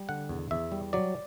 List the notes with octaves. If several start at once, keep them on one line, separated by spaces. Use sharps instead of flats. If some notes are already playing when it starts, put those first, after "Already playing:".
Already playing: G3
D3 F#5
E2
E2 E5
G3
F#3 D5